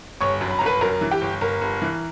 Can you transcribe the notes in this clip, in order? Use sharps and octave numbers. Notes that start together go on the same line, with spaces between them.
G1 C#5 C#6
F#2
B5
G1 A#5
B4 B5
F#2 A#4 A#5
E3
G4 G5
G1
G1 A#4 A#5
G1
E3